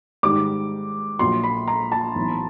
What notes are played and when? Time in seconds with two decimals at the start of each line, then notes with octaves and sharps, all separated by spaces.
0.23 G#2 D#3 G3 D6
1.19 A#1 A#2 F#3 C6
1.43 B5
1.68 A#5
1.92 A5
2.15 B1 A2 E3